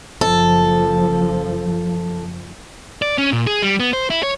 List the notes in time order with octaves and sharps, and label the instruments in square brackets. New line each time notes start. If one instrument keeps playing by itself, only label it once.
[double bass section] F#1 F3 [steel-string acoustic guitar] A4
[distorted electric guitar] D5
C#4
A#2
G#4
G3
B3
C5
E4
C#5